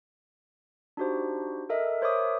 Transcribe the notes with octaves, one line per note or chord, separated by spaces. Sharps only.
D4 D#4 F#4 G4 C5
A4 A#4 D#5 E5
A#4 C5 C#5 E5 D6 D#6